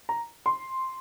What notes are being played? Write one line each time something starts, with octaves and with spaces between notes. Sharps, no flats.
A#5
C6